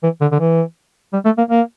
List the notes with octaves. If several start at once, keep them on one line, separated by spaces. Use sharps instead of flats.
E3
D3
D3
E3
G3
A3
A#3
A#3